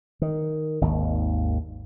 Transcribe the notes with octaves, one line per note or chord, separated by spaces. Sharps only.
D#3
G#1 D#2